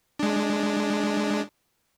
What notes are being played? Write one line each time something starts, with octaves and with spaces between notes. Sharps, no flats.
G#3 D4